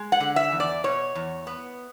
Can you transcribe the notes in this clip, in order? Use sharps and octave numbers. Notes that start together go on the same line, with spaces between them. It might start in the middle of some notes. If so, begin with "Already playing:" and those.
Already playing: G#3
F#5
D3
E5
E2
D5
B2 C#5
E2
B3